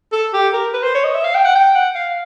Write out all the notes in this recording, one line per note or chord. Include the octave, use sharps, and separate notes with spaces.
A4
G4
A#4
B4
C5
C#5
D#5
E5
F5
G5
F#5
G5
F#5
F5